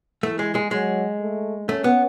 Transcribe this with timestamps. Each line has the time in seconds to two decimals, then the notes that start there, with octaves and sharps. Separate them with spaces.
0.23 E3 A3
0.39 G#3
0.55 G#3
0.71 F#3 G#3
1.20 A3
1.69 A3 C#4
1.84 B3